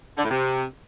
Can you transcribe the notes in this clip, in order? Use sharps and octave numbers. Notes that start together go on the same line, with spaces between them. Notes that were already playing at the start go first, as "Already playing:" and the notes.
D3
A2
C3